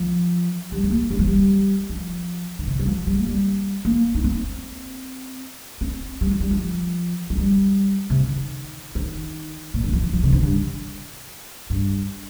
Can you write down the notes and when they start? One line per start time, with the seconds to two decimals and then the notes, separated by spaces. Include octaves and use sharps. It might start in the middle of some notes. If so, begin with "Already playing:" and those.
Already playing: F3
0.72 G3
0.84 G3
0.91 A#3
1.11 G3
1.19 F3
1.27 G3
1.89 F3
2.59 D#3
2.67 C3
2.79 G3
2.87 F3
3.07 G3
3.18 A#3
3.28 G3
3.85 A#3
4.15 D#4
4.24 C4
5.81 C4
6.21 G3
6.31 F3
6.40 G3
6.51 F3
7.30 F3
7.38 G3
8.10 C3
8.17 D#3
8.95 D#3
9.74 A#2
9.84 D#3
9.93 F3
10.03 F3
10.13 F3
10.24 C3
10.32 D#3
10.43 G2
11.70 G2